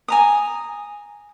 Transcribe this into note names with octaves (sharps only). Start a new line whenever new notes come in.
G#5 A#5 D#6